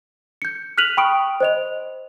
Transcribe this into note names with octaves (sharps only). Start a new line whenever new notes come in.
G6 C#7
F6 F#6 B6 D#7 F7 F#7
G5 B5 C#6 D#6 D7
C5 D#5 F7